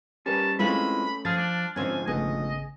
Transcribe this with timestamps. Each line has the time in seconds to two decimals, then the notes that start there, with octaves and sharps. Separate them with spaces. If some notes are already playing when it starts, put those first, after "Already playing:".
0.26 G3 C#4 G4 A#4 B4 A5
0.59 G#3 A3 C4 C#4 E4 F4 B4 B5
1.25 F3 G#4 F6 A6
1.37 D4
1.76 G#2 D3 F3 C4 C#4 G#5
2.07 G#1 C#3 A3 B3 D#5 G#5